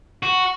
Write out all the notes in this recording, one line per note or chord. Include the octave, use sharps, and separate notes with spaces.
F#4